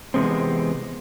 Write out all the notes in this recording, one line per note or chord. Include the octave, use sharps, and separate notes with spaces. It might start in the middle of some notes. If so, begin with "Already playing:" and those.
E2 C3 G#3 B3 C4